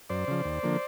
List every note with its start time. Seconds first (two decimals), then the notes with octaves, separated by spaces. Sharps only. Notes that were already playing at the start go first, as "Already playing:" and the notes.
0.09 F#2 C5 D5
0.28 C#3 F3
0.45 D#2
0.63 D3 F3 A#3